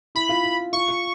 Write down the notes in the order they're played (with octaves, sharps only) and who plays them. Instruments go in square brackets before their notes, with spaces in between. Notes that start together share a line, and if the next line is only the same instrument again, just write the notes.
[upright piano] E4 [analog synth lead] B5
[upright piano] F4
E4
[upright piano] F4 [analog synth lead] C#6
[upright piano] F4